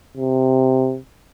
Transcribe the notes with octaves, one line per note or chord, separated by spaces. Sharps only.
C3